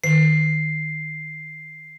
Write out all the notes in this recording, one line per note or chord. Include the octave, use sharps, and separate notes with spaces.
D#3 C7